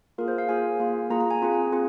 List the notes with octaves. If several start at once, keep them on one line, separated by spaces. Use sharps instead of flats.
A#3 F4 G#4 A#4
C5
F5
A#3 F4 G#4 G#5
A#3 F4 G#4
A#3 F4 G#4 A#5
A#5
G#5
C4 F4 G#4
C4 F4 G#4